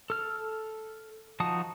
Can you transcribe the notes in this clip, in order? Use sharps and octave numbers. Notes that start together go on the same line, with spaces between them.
A4 F6
F3 D#4 F#4 A5 D#6